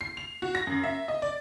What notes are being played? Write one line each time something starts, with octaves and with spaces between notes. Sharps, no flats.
C7
F7
F#4
A#6
F#2
E5
D#5
D5